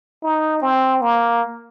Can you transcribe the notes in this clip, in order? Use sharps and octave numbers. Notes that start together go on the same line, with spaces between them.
D#4
C4
A#3